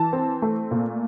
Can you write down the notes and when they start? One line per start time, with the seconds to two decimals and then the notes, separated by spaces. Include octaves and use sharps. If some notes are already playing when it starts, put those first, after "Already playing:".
Already playing: E3 A5
0.13 C4
0.42 A3
0.71 A#2